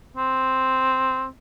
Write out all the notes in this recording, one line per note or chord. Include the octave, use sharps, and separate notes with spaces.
C4